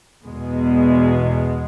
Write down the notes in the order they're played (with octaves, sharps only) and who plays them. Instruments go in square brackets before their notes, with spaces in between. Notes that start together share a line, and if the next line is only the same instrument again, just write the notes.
[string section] E2 B2 G#3